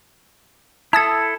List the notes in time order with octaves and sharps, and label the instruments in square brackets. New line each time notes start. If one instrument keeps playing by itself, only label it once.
[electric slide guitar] E4 A4 [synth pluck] A5 D#6 G#6